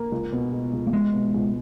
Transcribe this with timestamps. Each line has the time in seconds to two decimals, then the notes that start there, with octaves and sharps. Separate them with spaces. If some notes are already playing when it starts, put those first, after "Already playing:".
Already playing: A#3
0.12 C#2
0.32 B2
0.52 G#3
0.73 C#2
0.87 A#3
0.93 B2 G#3
1.13 B2
1.34 C#2